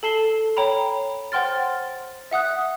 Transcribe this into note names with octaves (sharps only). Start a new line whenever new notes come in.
A4 A5 C7 G7
C#5 G5 A#5 B5
C5 F#5 G5 C6 F6 A6
E5 F#5 D#6 F#6